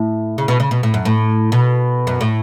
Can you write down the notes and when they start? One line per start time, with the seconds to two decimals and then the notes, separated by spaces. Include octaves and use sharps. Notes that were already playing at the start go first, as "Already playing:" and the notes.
Already playing: A2
0.38 C#3
0.48 B2
0.60 C#3
0.71 B2
0.83 A2
0.94 F#2
1.05 A2
1.52 B2
2.07 F#2
2.21 A2